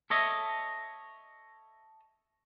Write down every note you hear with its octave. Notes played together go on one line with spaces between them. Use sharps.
A4 C#5 D#5 E5